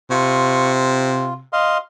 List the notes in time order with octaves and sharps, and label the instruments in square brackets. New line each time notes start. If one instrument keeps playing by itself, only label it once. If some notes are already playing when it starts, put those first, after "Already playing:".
[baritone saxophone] C3 [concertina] F4 C#6
[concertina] F4
D#5 F5 C6